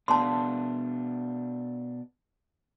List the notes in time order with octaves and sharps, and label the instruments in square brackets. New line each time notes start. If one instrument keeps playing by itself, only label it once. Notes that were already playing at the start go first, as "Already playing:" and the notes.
[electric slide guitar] B2 D4 F5 [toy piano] A5 C6